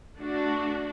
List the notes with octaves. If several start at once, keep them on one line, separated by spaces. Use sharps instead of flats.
A3 D4 F#4